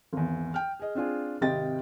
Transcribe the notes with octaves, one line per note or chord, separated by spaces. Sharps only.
G#1 E2
G5 F6
G#4 D#5
C4 D4 F4 G#4
G#1 C3 G4 D#5 G5 A6